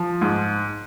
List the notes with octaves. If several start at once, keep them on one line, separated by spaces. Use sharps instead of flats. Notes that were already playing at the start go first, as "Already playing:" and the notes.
Already playing: F3
G#2